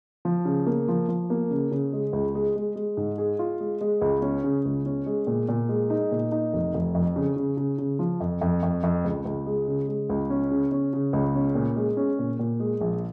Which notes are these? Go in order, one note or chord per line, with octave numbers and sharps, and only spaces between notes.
F3
C#3
A#3
F3
F3
A#3
C#3
C#3
G#3
C#2
G#3
G#3
G#3
G#2
G#4
F4
G#3
G#3
C#2
C#4
C#3
C#2
C#4
G#3
A#2
A#2
G#3
D#4
A#2
D#4
F1
F1
F2
C#3
C#3
C#3
C#3
F3
F2
F2
F2
F2
C#2
C#2
G#3
C#3
G#3
C#2
C#4
C#3
C#4
C#3
C#2
C#4
A#2
G#3
C#4
A#2
A#2
G#3
A#1